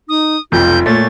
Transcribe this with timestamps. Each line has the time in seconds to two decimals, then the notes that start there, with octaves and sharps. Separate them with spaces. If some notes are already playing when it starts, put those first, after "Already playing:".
0.09 D#4 D#6
0.52 F1 B1 F2 F4 G6
0.86 A#2 A3 C#5 A6